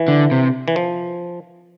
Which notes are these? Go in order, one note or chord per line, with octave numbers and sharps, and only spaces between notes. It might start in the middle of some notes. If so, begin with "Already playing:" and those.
Already playing: E3
D3
C3
E3
F3